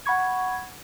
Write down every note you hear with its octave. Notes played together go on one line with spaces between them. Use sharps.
F#5 B5 C#6 G#6